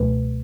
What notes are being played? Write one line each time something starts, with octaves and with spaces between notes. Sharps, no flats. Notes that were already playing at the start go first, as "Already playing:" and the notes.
Already playing: C#2 B2 F#3 A3 B4